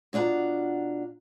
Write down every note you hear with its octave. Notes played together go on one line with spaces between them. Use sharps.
B2 D4 F4 F#5 A#5